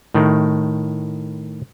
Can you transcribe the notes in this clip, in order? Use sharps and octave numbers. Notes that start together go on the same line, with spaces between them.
A2 D#3